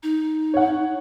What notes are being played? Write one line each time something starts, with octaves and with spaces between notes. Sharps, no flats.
D#4
C#5 F#5